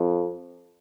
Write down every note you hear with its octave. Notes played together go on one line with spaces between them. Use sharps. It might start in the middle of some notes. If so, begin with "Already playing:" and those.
Already playing: F2